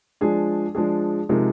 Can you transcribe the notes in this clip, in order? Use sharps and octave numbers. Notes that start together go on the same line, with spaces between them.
F3 G#3 D4 G#4
F3 G#3 D4 G#4
C3 F3 G#3 D#4 A#4